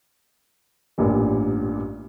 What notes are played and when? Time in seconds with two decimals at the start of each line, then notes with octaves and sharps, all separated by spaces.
0.98 A1 G2 A#2 G3